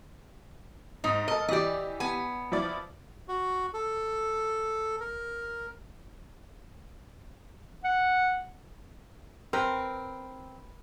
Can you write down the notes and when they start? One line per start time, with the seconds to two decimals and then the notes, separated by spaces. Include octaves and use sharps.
1.04 G#2 D#4
1.28 A4 A#4 D#5
1.49 E3 G4 D5 D#5
2.00 B3 G#5
2.52 F3 E4 D5
3.28 F#4
3.74 A4
5.00 A#4
7.84 F#5
9.53 C4 A#4 B4